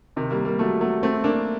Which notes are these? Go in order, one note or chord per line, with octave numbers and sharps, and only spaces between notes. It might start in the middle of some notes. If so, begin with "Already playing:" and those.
C3 D#3
G3 A#3
G3 A#3
F#3 A3
F#3 A3
A3 C4
A#3 D4